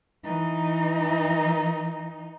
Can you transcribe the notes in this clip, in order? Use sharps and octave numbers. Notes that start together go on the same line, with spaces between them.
E3 D#4